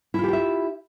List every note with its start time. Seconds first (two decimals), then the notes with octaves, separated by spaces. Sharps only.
0.14 E4
0.19 F4
0.24 G4
0.28 G5
0.33 E5